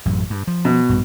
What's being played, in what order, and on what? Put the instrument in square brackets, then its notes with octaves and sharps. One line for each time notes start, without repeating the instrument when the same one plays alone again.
[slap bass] A1 F#2
G2
F3
[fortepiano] B2
[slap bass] A#1 G2